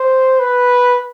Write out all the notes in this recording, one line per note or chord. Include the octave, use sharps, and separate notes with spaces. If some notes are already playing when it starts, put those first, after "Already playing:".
Already playing: C5
B4